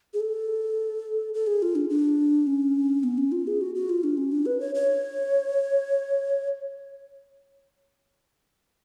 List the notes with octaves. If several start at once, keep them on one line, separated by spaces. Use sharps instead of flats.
G#4
A4
A4
G#4
F4
D4
D4
C#4
B3
C#4
F4
G#4
F#4
F#4
F4
D4
C#4
D4
B4
C#5
C#5